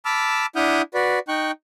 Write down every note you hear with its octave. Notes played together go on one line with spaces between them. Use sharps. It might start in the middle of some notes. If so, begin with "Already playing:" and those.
A5 B5 D6 E6 F6
D4 E4 F#5 D#6 F6 G6
F#4 B4 D5
D#4 G5 C#6 F#6